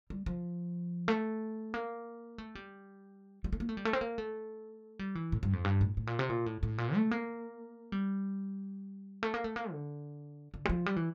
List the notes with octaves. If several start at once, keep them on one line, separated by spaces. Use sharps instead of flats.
G3
F3
A3
A#3
A3
G3
G3
A3
A#3
A3
G3
A3
C4
A#3
A3
G3
E3
A2
G2
F2
G2
A2
A2
A#2
C3
A#2
A2
A2
A#2
A3
A#3
G3
A3
A#3
A3
A#3
D3
D3
G3
F3
G3
E3